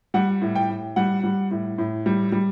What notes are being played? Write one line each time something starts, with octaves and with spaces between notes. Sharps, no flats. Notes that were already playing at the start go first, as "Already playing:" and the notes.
G3 F#5
A2
G5
A2
G3 F#5
G3
A2
A2
G3
G3